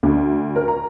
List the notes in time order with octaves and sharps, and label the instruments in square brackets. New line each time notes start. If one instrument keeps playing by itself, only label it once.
[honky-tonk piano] D2
A#4
A#5